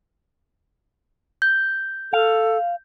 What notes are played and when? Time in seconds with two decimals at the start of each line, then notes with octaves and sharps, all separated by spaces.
1.42 G6
2.13 A4 F5